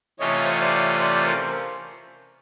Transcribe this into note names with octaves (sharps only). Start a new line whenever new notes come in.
C3 E3 A3 C#4 F4 C#5 D#5
C5
C#5
C5 D5
C5 D5
A#4 C5